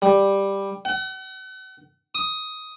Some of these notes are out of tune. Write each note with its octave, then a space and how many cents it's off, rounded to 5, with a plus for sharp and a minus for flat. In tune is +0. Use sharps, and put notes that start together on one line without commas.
G3 +5
F#5 +40
D#6 +10